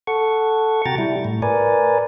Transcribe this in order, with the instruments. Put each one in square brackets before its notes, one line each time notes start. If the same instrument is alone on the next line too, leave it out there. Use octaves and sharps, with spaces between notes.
[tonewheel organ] A4 F#5 C#6
C3 F#4 G5 A#5 A6
G3 E4
A2
A#4 B4 D5 G#5